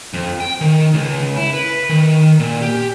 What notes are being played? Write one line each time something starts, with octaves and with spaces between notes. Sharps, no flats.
F2
G5
D#3
C#2
E4
B4
D#3
A#2
G4